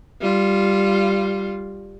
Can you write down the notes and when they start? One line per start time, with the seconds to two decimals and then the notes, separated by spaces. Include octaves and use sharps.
0.21 G3 F4